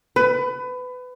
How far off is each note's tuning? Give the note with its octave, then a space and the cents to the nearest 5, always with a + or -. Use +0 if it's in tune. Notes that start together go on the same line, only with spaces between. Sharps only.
B4 +25